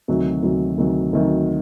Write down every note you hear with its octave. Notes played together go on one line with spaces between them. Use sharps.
D2 C3 D#3 F#3
D2 C3 D#3 F#3
D2 C3 D#3 F#3
D2 C3 D#3 F#3